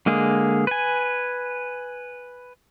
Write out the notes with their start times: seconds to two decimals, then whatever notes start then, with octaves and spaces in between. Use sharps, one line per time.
0.06 D3 G#3 A#3 G#4
0.67 B4 G#5